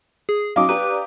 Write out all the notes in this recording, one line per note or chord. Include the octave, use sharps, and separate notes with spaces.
G#4
F#3 C#4 D#4 F5 D6 D#6
D4 G4 B4 A#5